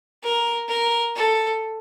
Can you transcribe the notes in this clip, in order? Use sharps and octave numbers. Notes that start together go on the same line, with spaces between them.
A#4
A#4
A4